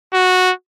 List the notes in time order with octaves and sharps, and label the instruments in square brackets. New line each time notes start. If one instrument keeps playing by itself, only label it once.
[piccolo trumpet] F#4